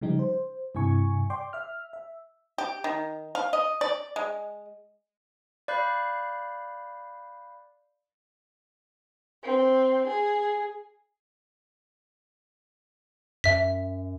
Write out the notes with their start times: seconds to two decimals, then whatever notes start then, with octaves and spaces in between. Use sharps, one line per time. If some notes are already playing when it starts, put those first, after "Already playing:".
0.01 C#3 F3 G3 D#4 G4
0.19 C5
0.75 G2 C3 E4 G#5 C#6
1.30 D5 G5 C6 D6
1.53 E5 F6
1.93 E5
2.58 G4
2.84 D#3
3.35 F5
3.53 D#5
3.81 D5
4.16 G#3
5.68 D5 F5 B5 F#6 G6 C7
9.42 C4
10.06 G#4
13.44 F#2 E5 B6